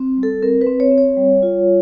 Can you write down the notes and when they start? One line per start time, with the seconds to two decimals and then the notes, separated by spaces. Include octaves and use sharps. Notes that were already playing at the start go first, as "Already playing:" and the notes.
Already playing: C4
0.17 G3
0.23 A4
0.42 C4 A#4
0.61 B4
0.67 C4
0.80 C#5
0.91 C4
0.98 C#5
1.17 G3
1.43 F4